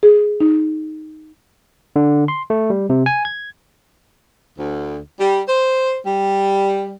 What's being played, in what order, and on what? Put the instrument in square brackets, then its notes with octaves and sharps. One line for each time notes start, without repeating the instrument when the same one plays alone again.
[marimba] G#4
D#4
[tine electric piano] D3
C6
A3
G3
C3
G#5
G#6
[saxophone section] D2
G3
C5
G3